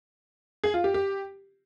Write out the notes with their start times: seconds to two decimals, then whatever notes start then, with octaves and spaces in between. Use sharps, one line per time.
0.64 G#4
0.74 F4
0.84 G4
0.94 G4